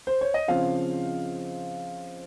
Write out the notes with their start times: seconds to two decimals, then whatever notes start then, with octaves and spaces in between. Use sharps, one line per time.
0.07 C5
0.21 C#5
0.34 D#5
0.48 C#3 F3 C4 F5